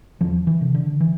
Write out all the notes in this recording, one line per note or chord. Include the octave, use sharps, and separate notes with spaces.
E2 F3
E3
C3
D3
E3